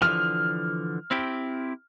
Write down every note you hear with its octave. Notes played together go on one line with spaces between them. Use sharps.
D3 E3 F3 F6
C4 E4 G4